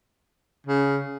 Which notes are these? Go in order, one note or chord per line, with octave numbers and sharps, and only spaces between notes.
C#3